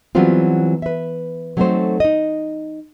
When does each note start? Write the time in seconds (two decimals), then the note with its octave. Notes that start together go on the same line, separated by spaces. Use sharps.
0.15 E3 F#3 G3 B3 C4 F4
0.82 B4 E5
1.57 F#3 A3 C4 D#4 A4 C5
2.00 D#4 D#5